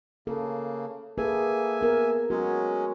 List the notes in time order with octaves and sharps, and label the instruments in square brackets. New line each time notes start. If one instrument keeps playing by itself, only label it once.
[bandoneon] C#3 A#3 [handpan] A4
[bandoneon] A#3 E5 G#5 [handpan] G#4 A4 B4
[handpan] B3 A#4
[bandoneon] F#3 G#3 C#4 [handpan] F#4